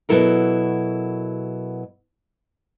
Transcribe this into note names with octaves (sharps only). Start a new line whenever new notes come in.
B2 F3 F#3 E4 A4 A#4